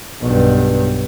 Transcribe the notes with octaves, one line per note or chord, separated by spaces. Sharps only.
B1 G2